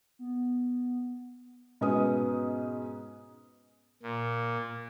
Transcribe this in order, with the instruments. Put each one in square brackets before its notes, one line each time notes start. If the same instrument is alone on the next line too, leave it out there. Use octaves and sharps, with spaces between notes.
[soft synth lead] B3
[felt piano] G#2 B2 C#4 B4 D#6
[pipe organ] A#2